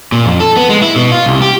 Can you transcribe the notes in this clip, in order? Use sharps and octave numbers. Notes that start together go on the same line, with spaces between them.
A#2
F2
A4
B3
G#3
E4
B2
F4
C2
G4